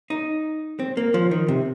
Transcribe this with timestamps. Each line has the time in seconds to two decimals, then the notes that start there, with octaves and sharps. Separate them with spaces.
0.10 D#4
0.80 C4
0.97 A#3
1.14 F3
1.31 D#3
1.48 C3